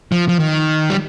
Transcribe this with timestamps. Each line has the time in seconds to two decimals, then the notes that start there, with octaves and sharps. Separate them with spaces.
0.12 F3
0.28 F3
0.39 D#3
0.90 G3